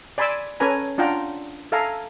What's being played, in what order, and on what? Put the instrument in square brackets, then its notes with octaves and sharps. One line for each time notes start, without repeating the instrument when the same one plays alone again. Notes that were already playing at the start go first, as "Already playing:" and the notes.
[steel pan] D5 G#5 B5 C6 D6 E6
C#4 A4 B4 G#5 A#5
D4 F4 F#5 G5 A#5
A4 E5 F5 G#5 A#5